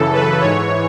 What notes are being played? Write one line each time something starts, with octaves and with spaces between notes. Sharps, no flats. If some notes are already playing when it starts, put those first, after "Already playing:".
Already playing: F#2 C#3 E3 A4
B4
G#2 E3 C#5